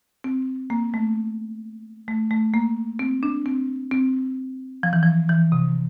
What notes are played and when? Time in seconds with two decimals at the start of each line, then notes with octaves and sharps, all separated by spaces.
0.24 C4
0.70 A#3
0.94 A3
2.08 A3
2.31 A3
2.54 A#3
2.99 C4
3.23 D4
3.46 C4
3.91 C4
4.83 F3
4.93 E3
5.03 F3
5.29 E3
5.52 C3